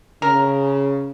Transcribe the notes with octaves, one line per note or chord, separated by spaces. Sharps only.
C#3 A#4